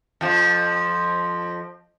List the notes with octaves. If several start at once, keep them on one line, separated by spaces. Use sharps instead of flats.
F2 F3